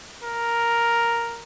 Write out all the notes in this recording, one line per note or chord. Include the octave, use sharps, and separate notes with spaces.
A#4